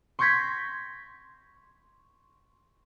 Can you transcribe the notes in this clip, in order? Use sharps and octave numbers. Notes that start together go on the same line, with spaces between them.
C6 C#6 G6 G#6 A#6 B6